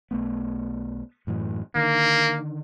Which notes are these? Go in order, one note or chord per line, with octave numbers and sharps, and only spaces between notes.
B1 A3 B3
F#2 A2 E3
D3 D#3 A#3